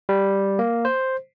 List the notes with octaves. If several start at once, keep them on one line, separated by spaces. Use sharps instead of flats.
G3
A#3
C5